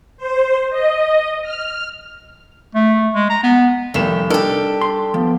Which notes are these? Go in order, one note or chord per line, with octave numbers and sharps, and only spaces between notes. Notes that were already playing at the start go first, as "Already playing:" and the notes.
C5
D#5
F6
A3
G#3
A#5
B3
F1 C3 D#3 G3 G4 E7
D4 D#4 G4 A4 A#4
C6
F3 B3